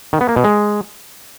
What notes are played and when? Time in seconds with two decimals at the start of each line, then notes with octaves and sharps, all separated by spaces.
0.13 D#3
0.21 B3
0.29 A#3
0.36 B2
0.44 G#3